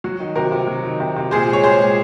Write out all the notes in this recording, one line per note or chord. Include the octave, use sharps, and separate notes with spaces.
F#3 F#4
D#3
C3 F#4 A#4
C3
F#3
D#3
C3
C3
A#2 G#4 C5
G#3
C#5
G#3 G#4 C5
A#2